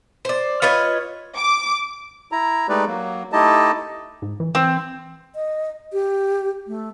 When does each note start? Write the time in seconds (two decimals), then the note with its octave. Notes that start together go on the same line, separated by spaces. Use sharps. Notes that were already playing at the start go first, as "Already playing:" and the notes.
0.25 C5 D5
0.62 F4 B4 C#5 D#5
1.37 D6
2.32 E4 A#5
2.69 G#3 A3 D#4 G4 B4 D5
2.87 F#3 A#3
3.33 A3 D#4 E4 G4 D#5 A5
4.22 G#2
4.40 E3
4.55 E3 C4
5.35 D#5
5.93 G4
6.67 A3